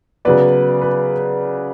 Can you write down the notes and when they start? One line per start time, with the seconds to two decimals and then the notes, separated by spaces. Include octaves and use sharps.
0.25 C#3 F#3 B3 B4 D5
0.82 B4